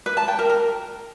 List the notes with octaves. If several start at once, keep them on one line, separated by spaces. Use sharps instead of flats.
B4
A5
G5
A#4
A#4